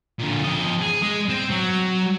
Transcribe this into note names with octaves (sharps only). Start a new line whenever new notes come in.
A#2 D3
F3 D#5
G#4
G#3
C4
F#3